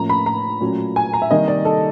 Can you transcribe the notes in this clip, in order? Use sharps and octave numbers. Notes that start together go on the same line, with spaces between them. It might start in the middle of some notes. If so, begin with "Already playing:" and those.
Already playing: A2 F3 A#3 C#4 A#5
B5
A#5
A#2 F#3 A3 C#4
G#5
A#5
E5
C3 D#3 G3 A#3 D#5
D5
A4